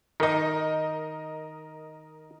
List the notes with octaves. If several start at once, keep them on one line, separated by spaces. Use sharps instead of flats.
D#3 D#4 A#4 D#5